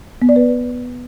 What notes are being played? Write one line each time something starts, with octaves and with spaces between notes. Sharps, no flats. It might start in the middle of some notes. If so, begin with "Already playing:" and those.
B3
D5
B4